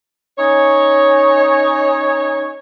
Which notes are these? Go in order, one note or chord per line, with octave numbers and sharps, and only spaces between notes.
C#4 D#4 C#5